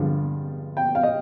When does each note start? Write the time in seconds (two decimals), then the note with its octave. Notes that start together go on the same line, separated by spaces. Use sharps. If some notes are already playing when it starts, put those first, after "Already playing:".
Already playing: G2 D3 F3 G#3
0.77 G5
0.95 F5
1.03 D#5